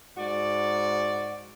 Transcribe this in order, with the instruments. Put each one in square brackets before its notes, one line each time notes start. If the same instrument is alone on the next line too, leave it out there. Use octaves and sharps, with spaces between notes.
[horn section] G#2 F#4 D5